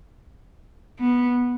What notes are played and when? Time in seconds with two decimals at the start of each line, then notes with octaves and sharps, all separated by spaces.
0.99 B3